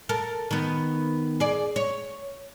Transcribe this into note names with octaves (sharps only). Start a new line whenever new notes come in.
A4 A#4
D#3 B3
G#4 D5
C#5